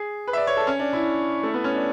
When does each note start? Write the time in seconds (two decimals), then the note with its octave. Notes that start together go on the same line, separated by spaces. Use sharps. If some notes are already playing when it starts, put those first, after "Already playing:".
Already playing: G#4
0.28 B4
0.33 E5
0.37 D5
0.47 C#5
0.57 A4
0.67 C#4
0.79 D4
0.93 E4
1.43 A3
1.54 B3
1.64 C#4
1.75 D4